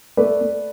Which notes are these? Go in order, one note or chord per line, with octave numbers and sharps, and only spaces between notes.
A3 B4 D5
A3